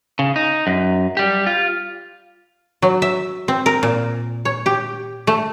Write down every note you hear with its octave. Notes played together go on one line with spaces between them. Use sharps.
C#3
D#4
F#2
G3 G4
F4
F#3
E5
C4
A#4
A#2
C#5
G4
A3